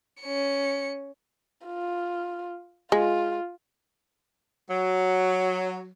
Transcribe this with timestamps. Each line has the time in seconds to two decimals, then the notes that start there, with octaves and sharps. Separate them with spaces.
0.21 C#4 C#7
1.66 F4
2.92 G#3 F4
4.70 F#3